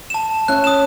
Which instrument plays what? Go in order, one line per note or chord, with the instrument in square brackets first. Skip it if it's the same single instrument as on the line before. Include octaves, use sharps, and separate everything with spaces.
[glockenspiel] A5 E7
[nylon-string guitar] C#4 E5 [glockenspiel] F#6
[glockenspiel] D#6 E7